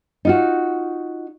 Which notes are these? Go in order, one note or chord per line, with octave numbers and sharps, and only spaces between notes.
D#4 F4 F#4